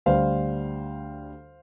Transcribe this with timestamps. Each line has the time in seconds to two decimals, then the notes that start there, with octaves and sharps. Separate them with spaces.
0.06 D2 D3 G3 C5 F5